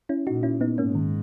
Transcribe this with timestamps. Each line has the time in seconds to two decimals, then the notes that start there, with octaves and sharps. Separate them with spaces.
0.09 C#4 E4
0.26 A#2 D#4 F#4
0.43 C#4 E4
0.61 B3 D#4
0.78 G#2 A#3 C#4
0.95 D#3